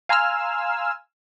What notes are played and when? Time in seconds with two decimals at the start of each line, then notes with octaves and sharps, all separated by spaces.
0.09 F5 G#5 A#5 C6 E6 F6